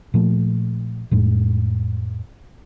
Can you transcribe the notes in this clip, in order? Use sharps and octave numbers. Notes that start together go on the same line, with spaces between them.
A#2 F3 A3
F2 A2 G#3